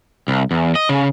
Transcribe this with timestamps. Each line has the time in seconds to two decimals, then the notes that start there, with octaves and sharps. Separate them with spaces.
0.28 C2
0.51 E2
0.75 D#5
0.89 C#3